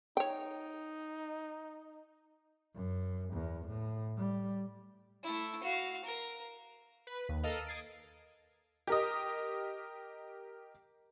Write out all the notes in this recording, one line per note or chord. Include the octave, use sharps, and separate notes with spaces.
D#4 C#5 G5
F#2
E2
A2
G3
A3 E4
F#4 F5
A#4
B4
D#2
A4 A#4 D#5 F5
D#6 G#6 A6 C7 D7
G4 A#4 D#5